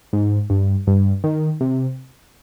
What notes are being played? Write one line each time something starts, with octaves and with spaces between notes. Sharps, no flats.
G#2
G2
G2
D#3
C3